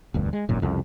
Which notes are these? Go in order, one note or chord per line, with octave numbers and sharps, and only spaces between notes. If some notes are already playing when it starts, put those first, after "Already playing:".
E1 D2 G2
G#3
D#1 G#1 F#2 A#2
C2 F2 C#3